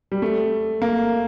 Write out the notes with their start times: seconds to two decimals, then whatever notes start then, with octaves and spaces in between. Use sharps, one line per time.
0.12 G3
0.22 A3
0.82 A#3